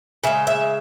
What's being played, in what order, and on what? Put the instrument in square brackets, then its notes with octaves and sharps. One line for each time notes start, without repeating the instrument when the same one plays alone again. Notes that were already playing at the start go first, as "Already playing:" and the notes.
[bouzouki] C#3 G#3 E5
E5